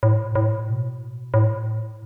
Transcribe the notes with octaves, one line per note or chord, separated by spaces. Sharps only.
A2
A2
B2
A2